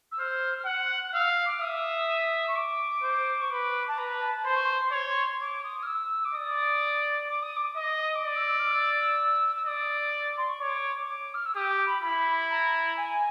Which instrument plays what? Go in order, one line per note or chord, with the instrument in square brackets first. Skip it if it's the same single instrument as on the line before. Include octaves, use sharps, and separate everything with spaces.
[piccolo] E6
[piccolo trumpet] C5 [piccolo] F6
[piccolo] F6
[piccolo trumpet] F#5 [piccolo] F#6
[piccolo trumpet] F5 [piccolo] E6
[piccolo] D6
[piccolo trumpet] E5 [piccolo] D#6
[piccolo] C#6
D6
[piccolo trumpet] C5
[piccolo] C#6
[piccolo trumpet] B4 [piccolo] D6
[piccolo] A5
[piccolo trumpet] B4 [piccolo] A#5
[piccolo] A#5
A5
[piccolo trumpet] C5 [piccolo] C6
[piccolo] C#6
C6
[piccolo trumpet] C#5
[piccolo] D6
D#6
F6
E6
D6
[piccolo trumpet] D5 [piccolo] D#6
[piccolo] D6
D#6
D6
[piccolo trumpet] D#5 [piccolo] D#6
[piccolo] D6
[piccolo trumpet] D5 [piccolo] D#6
[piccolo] E6
E6
F6
E6
E6
[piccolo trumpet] D5 [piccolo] D#6
[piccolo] C6
C#6
[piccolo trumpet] C#5 [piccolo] D6
[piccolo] D6
F6
E6
[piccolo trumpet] G4 [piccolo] D#6
[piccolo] B5
[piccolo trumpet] E4 [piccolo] B5
[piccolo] A#5
G#5